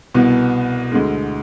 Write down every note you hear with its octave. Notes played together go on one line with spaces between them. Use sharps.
C2 B2 B3
D2 D3 G#3